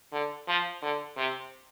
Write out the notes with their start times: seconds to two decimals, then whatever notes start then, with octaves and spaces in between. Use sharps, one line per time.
0.12 D3
0.47 F3
0.82 D3
1.17 C3